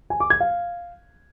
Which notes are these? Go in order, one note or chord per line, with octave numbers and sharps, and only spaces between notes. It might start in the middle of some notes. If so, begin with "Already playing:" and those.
G#5
D6
G#6
F5